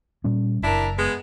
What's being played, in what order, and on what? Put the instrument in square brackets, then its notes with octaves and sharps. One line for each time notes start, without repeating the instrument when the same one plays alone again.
[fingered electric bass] A#2 G3 C#4
[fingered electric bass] F#1 [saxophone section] D4 E4 A#4
[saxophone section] G#3 B3